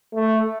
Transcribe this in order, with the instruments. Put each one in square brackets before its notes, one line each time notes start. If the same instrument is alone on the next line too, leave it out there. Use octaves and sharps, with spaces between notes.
[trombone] A3